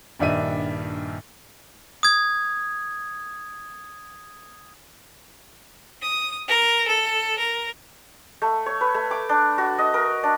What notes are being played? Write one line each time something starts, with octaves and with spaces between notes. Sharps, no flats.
A#1 G2 D#3 D4 E5 D#7
D#6 G#6
D#6
A#4
A4
A#4
A3
C#5
B4
A3
D6
D4
F#4
D#5
A#4
D4